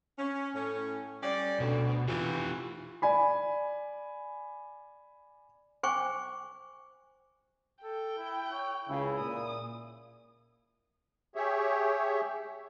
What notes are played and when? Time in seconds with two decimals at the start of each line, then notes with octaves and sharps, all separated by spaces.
0.18 C#4
0.54 A2 C#4
1.23 G3 C#4 D5
1.60 D2 B2
2.08 E3 F4 G4
3.02 D5 G#5 B5
5.83 C5 G5 G#5 C#6 D6
7.84 A4 G5
8.18 E4
8.52 C#5
8.89 C#2 C#3 E4
9.19 A#2 D#6
11.35 G4 G#4 C#5 E5